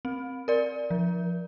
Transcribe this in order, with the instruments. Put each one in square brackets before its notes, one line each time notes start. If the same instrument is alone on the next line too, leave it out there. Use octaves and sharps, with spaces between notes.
[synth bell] C4
A#4 D5
F3